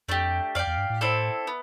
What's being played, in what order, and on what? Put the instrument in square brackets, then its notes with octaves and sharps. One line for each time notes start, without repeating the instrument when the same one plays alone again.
[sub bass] F2 [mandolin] A3 D4 G4
[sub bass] F2 [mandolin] G4 D5 F5
[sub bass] E2
G2
A2
[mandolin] C4 E4 A4 D5
B3